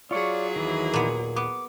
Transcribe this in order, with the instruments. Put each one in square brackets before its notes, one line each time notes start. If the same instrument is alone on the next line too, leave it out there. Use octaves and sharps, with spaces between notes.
[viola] F#3 G#4 [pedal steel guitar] F4 C#6 [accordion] C#5 D5
[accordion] D#2 [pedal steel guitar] D#3 E3
[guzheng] A#2 B3
[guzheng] B3 [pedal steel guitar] D6